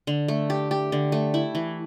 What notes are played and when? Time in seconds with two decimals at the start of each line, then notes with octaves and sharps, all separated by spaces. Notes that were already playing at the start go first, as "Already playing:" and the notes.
0.07 D3
0.28 A3
0.50 G4
0.71 G4
0.92 D3
1.12 A3
1.34 E4
1.55 E3